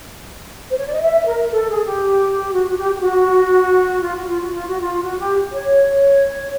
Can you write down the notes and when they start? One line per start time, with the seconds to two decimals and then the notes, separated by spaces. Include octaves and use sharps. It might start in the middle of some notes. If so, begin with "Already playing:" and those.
0.70 C5
0.78 C#5
0.86 D5
0.93 D#5
1.01 E5
1.27 A#4
1.44 A#4
1.51 A4
1.68 G#4
1.84 G4
2.52 F#4
2.69 F#4
2.77 G4
2.94 G4
3.01 F#4
4.02 F4
4.15 F#4
4.28 F4
4.41 F#4
4.53 F4
4.67 F#4
4.80 F4
5.02 F#4
5.19 G4
5.52 C#5